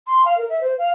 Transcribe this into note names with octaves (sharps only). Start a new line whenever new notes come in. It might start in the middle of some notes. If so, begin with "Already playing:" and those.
C6
F5
A#4
E5
C5
F5